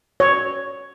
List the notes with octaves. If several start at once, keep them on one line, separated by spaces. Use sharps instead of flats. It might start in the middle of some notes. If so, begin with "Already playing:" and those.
C#5